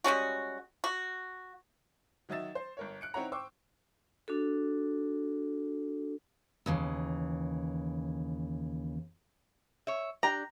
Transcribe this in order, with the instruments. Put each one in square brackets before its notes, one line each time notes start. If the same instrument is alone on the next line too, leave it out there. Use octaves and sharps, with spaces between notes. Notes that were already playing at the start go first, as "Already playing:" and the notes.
[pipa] G3 G#3 C#4 F#4
F#4
[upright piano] D#3 F#3 D#5 E5 A6 E7
C5
G1 A#4 C#5
F#6 C#7 D7
C4 D#4 E4 C#5 F#5 A#5
C5 G5 C#6 D6 E6
[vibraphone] D4 F#4 A4
[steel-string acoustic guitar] D#2 C#3 E3
[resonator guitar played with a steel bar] C#5 E5
[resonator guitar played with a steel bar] D4 G4 [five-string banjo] A#5